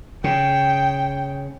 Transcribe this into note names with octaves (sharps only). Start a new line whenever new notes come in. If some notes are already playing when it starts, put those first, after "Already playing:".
C#3 G5